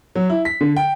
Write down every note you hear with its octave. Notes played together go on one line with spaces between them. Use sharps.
F#3
E4
B6
D3
G5